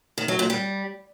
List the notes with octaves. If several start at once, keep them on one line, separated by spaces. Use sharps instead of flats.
D#3
F#3
A#2
G3